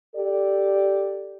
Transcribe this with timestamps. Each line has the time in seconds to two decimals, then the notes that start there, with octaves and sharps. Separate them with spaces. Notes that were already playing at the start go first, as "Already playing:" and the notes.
0.15 G4 A4 D5